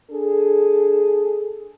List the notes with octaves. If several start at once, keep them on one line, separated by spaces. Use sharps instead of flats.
D4 G#4 A4